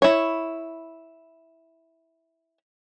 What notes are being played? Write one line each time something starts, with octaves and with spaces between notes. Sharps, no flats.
E4 C#5